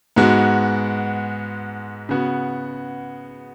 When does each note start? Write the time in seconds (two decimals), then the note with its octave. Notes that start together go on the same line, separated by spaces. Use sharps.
0.16 G#2 G#3 B3 F#4
2.09 C#3 B3 F#4